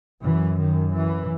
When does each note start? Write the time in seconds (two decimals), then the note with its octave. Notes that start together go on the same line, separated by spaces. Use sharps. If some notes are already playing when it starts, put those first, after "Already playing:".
0.23 F#2 E3
0.59 D#3
0.94 E3